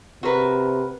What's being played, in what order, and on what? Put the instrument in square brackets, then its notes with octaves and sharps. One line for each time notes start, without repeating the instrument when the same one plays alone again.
[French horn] C3 [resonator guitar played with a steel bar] F#4 A#4 B4